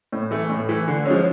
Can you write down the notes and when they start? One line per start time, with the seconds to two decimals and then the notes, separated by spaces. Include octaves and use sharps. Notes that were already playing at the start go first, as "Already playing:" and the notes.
0.12 A2
0.31 E3 A3
0.50 A2
0.69 E3 A3
0.88 D3
1.06 F3 G#3 C#4